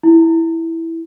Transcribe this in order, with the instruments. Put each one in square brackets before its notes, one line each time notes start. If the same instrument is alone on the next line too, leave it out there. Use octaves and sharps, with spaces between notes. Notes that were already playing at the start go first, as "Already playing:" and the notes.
[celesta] E4